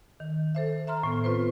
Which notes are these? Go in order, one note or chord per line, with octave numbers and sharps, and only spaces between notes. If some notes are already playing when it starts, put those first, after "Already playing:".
D#3
A4 C5 E5
E5 A#5 C6 F6
A2 B3
C4 F4 B4 C5